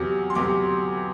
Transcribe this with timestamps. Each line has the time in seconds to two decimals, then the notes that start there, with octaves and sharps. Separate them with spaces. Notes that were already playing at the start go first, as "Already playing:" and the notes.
Already playing: E2 C3 F#3 D6
0.30 C6
0.35 E2 C3 F#3 D6